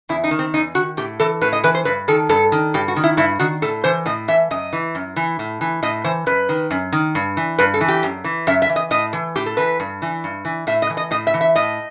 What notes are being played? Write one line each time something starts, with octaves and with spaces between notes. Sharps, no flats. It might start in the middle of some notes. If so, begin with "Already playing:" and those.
E2 E4
D#4
D#3
C4
E2 D#4
D#3 F#4
A2 G4
E3 A4
A2 B4
D#5
E3 B4
C5
G2 B4
D#3 A4
G2 A4
D#3
G2 G4
F#4
D#3
E4
G2 E4
D#3 F#4
A2 A4
E3 C5
A2 D#5
E3 E5
F#2 D#5
E3
F#2
E3
A2
E3
A2 D#5
E3 C5
F#2 B4
D#3
F#2
D#3
G2
E3
G2 B4
A4
E3
G4
F#2
E3
F#2 E5
E5
E3
D#5
A2 D#5
E3
A2 G4
A4
E3 B4
G2
E3
G2
E3
A2 E5
D#5
E3
D#5
A2 D#5
E5
E3
E5
A2 D#5